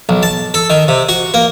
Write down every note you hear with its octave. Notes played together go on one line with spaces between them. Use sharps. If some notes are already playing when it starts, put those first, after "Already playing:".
B1
A5
A4
D#3
C3
F#4
A#3